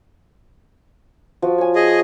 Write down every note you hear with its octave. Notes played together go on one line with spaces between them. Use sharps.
F3 F#4
C#5 G#5
G#4 D#5